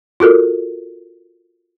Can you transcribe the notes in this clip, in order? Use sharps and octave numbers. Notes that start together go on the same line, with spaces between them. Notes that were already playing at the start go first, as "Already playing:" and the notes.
F4 F#4 A4 A#4